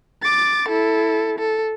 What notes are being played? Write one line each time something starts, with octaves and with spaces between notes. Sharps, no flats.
D6 A6
E4 A4
A4